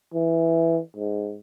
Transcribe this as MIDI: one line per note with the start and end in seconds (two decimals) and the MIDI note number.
0.14 0.79 52
0.97 1.38 44